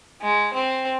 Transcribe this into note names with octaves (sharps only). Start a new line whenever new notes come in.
G#3
C4